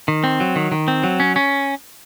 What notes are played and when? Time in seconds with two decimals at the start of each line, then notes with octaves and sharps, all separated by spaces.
0.08 D#3
0.24 C4
0.40 F#3
0.56 D#3
0.72 D#3
0.88 C4
1.04 F#3
1.20 C#4
1.36 C#4